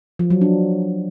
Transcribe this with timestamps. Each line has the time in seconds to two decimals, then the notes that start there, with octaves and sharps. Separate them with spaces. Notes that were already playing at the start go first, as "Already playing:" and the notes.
0.19 F3
0.30 F#3
0.41 D4